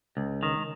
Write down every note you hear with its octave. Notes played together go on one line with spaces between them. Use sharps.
C#2
D#3